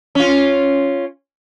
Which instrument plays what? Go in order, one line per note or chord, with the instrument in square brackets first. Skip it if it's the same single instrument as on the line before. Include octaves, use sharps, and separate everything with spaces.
[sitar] C#4 F4